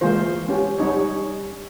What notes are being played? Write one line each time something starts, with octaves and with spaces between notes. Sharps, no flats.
E3 G#3 A#3 F4 C5
C#4 G4
G3 C#4 D#4 C#5